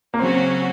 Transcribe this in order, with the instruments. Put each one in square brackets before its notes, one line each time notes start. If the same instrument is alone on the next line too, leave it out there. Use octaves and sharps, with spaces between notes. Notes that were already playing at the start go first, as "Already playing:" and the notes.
[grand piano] A#3
[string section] C#3 F#3 C#4 F#4 [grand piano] C4